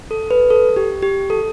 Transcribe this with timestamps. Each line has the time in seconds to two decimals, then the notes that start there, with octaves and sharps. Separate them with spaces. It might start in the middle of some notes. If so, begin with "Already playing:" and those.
0.11 A4
0.31 B4
0.50 A4
0.76 G4
1.02 G4
1.30 A4